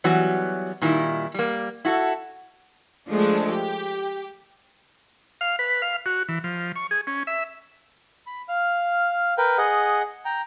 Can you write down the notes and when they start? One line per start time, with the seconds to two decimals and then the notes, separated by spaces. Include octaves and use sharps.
0.04 E3 F#3 G3 B3 F#4
0.82 A#2 D#3 G3 E4
1.34 G3 A#3
1.85 E4 F#4 G#4 A4
3.09 F3 G#3 A3 D4
3.50 G4
5.41 F5
5.59 B4
5.82 F5
6.06 F#4
6.29 E3
6.44 F3
6.76 C#6
6.91 G#4
7.07 C#4
7.27 E5
8.27 B5
8.48 F5 F6
9.38 A#4 B4 G5
9.58 G#4 D#5 F#5
10.25 G5 A#5